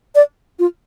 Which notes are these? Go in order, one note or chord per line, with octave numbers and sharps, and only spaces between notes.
D5
F4